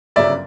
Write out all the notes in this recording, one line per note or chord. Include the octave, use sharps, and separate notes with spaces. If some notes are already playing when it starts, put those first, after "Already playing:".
G1 F#2 C#3 F#3 D5 E5